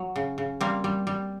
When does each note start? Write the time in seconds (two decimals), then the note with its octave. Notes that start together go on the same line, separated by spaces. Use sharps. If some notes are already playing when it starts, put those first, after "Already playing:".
Already playing: F#3
0.16 C#3
0.38 C#3
0.61 G3 A#3 C4
0.84 G3
1.07 G3